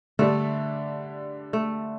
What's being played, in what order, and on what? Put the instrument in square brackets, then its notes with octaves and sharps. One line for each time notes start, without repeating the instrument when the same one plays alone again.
[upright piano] D3 G3 D4 [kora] A3
[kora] A3